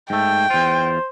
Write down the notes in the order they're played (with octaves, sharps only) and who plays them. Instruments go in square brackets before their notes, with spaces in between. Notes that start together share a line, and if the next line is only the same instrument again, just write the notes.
[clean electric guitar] G#2 A3 [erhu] G5
[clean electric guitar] E2 F4 [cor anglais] C5